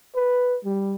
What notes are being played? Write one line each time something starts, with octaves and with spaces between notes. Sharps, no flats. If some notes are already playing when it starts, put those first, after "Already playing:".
B4
G3